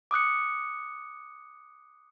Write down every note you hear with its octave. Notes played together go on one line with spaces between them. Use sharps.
D6 D#6 F#6 C#7